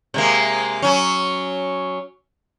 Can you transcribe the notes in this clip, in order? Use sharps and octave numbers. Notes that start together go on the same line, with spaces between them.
C3 G#3 A#3
F#3 C#4